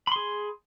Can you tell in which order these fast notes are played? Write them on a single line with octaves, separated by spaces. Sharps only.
B5 C6 G#4